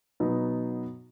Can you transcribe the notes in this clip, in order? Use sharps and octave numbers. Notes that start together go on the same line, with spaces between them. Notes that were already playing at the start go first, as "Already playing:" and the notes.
B2 F#3 B3 D#4